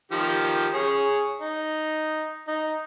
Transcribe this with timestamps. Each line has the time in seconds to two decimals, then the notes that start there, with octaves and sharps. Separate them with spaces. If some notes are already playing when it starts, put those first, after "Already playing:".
0.12 D#3 F3 G4
0.74 G#4 C#5
1.41 D#4
2.47 D#4